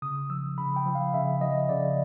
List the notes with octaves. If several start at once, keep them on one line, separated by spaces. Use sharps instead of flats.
C#3 D#6
F3 E6
C#3 B5
G5
F3
F5
C#3 E5
F3 D#5
C#3 D5